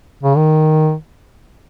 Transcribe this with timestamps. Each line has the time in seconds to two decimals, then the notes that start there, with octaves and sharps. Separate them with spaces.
0.23 C#3
0.37 D#3